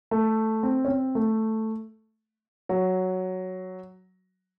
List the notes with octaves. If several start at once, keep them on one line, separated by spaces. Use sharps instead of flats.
A3
C4
C#4
C4
A3
F#3